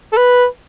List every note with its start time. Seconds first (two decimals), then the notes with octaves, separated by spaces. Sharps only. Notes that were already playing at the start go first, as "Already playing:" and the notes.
0.13 A4
0.17 B4